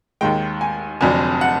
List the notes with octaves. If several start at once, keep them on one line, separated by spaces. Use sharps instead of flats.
D#2 D#3 G#3 G5
G#5
F1 F2 D3 F#3 G#5
F#5